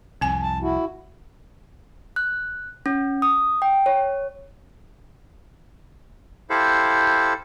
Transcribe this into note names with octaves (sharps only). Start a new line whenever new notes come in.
C2 F2 C4 G#5
A5
E4 F#4
F#6
C#4
D#6
G5
C#5
E4 G4 A4 C5 F5